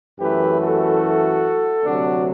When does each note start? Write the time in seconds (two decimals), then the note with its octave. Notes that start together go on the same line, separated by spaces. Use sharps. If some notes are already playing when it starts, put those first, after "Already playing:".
0.19 F#2 E3 A3 G4 B4
0.60 F#4 A4
1.83 D2 C3 F#3 D4 F#4